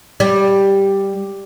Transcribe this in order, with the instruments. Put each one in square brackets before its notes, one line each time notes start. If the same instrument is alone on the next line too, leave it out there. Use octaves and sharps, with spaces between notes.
[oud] G3